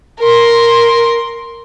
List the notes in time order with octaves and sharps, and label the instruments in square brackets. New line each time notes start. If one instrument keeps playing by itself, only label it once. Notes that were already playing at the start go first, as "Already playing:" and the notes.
[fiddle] A#4 C6